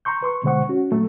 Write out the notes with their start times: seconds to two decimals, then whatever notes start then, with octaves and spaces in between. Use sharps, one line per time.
0.05 A#5 C6 C#6 G6
0.22 B4 C6 C#6
0.43 B2 D3 G#3 C5 F#5 C#6
0.69 C#4 F#4
0.92 A#2 F#3 A3